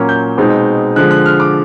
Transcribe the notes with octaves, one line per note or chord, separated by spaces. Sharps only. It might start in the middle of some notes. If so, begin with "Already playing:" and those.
Already playing: A#2 F#3 A#3 C#4 F6
G6
B2 G#3 C4 D#4
D3 F3 G#3 F#6
F#6
F6
D6